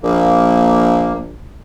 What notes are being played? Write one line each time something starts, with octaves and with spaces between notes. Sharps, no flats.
A#1 A#3